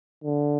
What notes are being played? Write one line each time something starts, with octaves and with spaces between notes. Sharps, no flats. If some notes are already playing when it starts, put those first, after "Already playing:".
D3